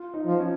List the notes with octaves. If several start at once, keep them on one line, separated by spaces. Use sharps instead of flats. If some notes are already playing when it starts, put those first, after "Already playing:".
Already playing: F4
D#4
F3
C#4